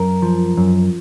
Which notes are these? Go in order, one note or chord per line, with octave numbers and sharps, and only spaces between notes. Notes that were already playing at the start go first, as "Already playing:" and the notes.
Already playing: F#2 A#4
F3
F#2